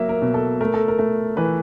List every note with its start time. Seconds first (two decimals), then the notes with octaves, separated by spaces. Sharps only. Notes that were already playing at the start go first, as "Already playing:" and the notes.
Already playing: F#3 A#3 E5
0.09 A#4
0.22 B2
0.34 A4
0.60 A3 A#4
0.74 A4
0.88 A#4
0.99 A3
1.37 E3 B4